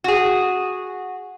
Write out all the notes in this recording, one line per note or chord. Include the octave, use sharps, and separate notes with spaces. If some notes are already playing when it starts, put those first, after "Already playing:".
F#4 G#4